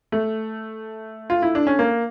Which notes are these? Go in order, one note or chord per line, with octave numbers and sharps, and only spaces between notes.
A3
F4
E4
D4
C#4
A#3